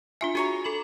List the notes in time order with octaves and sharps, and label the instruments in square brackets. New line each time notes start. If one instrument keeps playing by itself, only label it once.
[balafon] D4 F4 E5 [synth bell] G#5
[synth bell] F#4 [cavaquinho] G#4 C#5 A#5
[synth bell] A4 B5 F#7